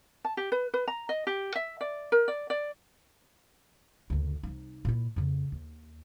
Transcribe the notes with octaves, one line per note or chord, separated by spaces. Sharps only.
A5
G4
B4
B4
A#5
D#5
G4
E5
D5
A#4
D5
D5
F#1 D2
C2 D#4
A#2 E4
F2 C#3
D#2